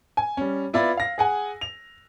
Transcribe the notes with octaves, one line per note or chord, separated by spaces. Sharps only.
G#5
G3 C#4
B3 E4 F4 D5 B5
F5 A#6
G#4 F#5 G#5
F7